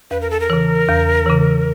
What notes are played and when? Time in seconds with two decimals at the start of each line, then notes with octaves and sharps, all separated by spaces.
0.11 E2 B4
0.21 A#4
0.30 A4
0.40 A#4
0.50 C#3 E3
0.88 E2
1.26 C#3 E3